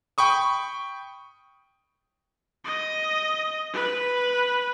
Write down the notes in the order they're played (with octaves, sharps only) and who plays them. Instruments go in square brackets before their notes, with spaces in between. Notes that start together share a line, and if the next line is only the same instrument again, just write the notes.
[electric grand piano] G5 B5 C#6 D#6
[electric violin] D#5
B4